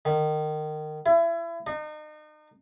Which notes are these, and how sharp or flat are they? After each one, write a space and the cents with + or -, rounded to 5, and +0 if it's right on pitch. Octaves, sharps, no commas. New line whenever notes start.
D#3 -25
E4 +30
D#4 -35